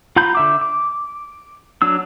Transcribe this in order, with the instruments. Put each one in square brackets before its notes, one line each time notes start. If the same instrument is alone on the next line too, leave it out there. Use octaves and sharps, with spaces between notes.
[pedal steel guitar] F4 F#5 A#5 B5 G6
D3 E5 D6
D6
F#3 D4 E6